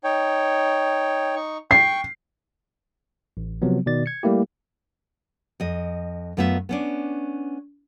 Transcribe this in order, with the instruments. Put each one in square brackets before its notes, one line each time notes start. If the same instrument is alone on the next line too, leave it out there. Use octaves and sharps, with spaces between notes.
[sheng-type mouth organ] D#4 C#5 G5
D#4 C#6
[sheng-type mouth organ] G5 C#6 [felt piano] C7
[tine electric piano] A1
C3 F3 F#3 B3
B2 D#3 D5 A6
G#6 C#7
G3 A3 A#3 E4 G4
[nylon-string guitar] F2 D#5
F#2 A3 B3 F4 F#4 E5
B3 C#4 D4